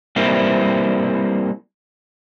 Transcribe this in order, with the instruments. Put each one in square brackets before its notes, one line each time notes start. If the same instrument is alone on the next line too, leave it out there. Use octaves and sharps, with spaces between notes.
[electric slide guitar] G3 A#3 C4 E4